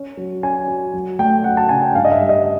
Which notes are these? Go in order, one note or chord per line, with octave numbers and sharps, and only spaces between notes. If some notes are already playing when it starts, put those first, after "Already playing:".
Already playing: C#4
F#3
C#4 G#5
F#3
F#3
A3 G5
F#3 F#5
A5
C#3 G#5
G5
G2 F5
D#5
E5
G3
D#5